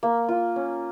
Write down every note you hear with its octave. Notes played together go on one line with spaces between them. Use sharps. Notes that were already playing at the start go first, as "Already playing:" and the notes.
A#3
F4
C#4